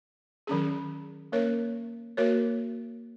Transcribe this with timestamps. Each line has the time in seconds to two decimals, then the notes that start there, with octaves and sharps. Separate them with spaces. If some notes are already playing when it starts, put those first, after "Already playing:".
0.47 D#3 F#3 C#4 G#4
1.32 A#3 C#4 A#4 C#5
2.17 A#3 F#4 A#4 C#5